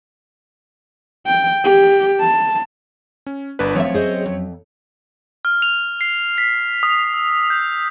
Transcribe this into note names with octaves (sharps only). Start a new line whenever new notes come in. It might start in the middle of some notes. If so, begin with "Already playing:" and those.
G5
G4
A5
C#4
G1 D4 B4
F#2 F3 A3 C4 C#5 E5
G#4 C5 D#5
F2
F6
F7
C7
B6
D#6
E6
G6